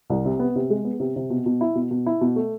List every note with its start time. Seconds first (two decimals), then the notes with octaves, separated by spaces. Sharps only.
0.10 C2
0.25 C3
0.39 B3
0.56 C3
0.70 G#3
0.85 B3
1.00 C3
1.16 C3
1.30 B2
1.46 B2
1.61 E4
1.75 B2
1.91 B2
2.06 E4
2.21 B2
2.36 A3